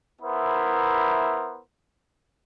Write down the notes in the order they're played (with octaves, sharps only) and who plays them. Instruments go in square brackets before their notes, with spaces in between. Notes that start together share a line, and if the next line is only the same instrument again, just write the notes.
[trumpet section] B3 E4 A#4 C5 E5